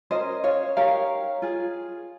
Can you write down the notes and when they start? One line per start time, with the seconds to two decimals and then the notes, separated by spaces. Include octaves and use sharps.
0.11 C#4 F4 A#4 C5 D#5
0.44 C#5 F5
0.77 D#4 G4 A#4 C#5 F5
1.42 F4 G#4